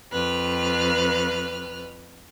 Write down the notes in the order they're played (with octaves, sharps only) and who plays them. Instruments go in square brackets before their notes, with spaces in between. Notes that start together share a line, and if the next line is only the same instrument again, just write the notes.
[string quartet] F2 B4 F6